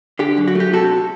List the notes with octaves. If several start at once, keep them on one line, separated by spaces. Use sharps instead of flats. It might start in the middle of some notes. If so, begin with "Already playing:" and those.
D3 G4
F#2
F#4
A3 G4
C3 F#4 A4